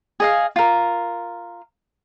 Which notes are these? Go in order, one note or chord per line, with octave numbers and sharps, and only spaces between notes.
G#4 D#5 F5
F4 A#4